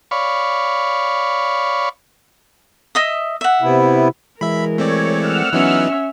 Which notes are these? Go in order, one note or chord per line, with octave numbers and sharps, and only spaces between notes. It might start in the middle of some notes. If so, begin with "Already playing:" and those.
C#5 D5 F5 B5 C#6
D#5 E5 D#6
E5 F#5
C3 B3 E4
E3 G#3 A#4 E5 B5
A3 C4 C#5 D5
F#5 E6 F6
E3 F#3 B3 C#4 D#4 E5